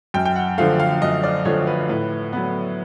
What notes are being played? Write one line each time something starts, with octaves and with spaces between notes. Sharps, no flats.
F#2 G5
G5
F#5
D3 F3 A3 F5
F5
F#2 D#5
D5
D3 F3 A3 C#5
B4
A2 B4
F#3 B3